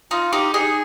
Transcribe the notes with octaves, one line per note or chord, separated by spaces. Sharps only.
D#4 F4
D#4 G4
D#4 G#4